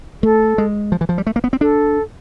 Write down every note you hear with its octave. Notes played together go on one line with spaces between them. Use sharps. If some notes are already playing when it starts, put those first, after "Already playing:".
A3 A4
G#3
F3
E3
F3
G3
A3
A#3
B3
C4
D4 A4